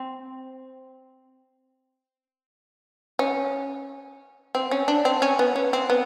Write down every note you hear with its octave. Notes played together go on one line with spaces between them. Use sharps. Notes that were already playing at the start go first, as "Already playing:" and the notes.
Already playing: C4
C#4
C4
C#4
D4
C4
C#4
B3
C#4
C4
B3